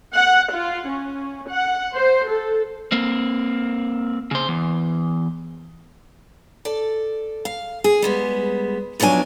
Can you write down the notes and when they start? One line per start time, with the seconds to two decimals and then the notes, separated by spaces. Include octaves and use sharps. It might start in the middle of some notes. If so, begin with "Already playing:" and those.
0.14 F#5
0.52 F4
0.88 C#4
1.49 F#5
1.96 C5
2.29 A4
2.92 A#3 C4
4.31 C#3 C5
4.48 E2
6.65 A4 D5
7.45 F5
7.84 G#4
8.02 G3 G#3 B3
9.00 B2 F3 F#3 D4 G#5